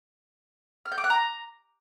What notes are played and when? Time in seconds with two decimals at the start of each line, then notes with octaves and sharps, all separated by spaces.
0.86 F6
0.92 G6
0.98 D6
1.04 F#6
1.10 A#5